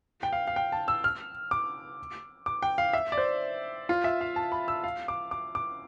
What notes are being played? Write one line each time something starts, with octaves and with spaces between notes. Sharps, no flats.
G5
F5
F5
G5
A5
E6
F6
D6
D6
G5
F5
E5
D5
C5
F4
E5
F5
A5
B5
E6
F5
D6
D6
D6